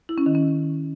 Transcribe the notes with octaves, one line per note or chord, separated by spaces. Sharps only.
E4
C#4
D#3
C#4